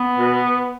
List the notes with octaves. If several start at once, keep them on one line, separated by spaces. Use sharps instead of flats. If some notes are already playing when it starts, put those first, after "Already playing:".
Already playing: B3
B2